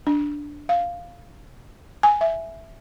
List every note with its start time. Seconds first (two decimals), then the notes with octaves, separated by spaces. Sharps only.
0.07 D4
0.69 F5
2.03 G#5
2.21 E5